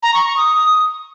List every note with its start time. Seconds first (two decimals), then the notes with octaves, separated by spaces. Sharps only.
0.03 A#5
0.14 C#6
0.25 C#6
0.37 D#6